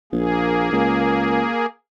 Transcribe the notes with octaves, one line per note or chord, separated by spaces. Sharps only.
A#1 A#3 G#4
C#2